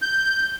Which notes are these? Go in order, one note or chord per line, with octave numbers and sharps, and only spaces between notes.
G6